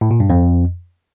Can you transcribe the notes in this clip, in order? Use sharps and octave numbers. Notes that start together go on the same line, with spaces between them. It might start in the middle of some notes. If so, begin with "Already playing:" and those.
A2
A#2
G2
F2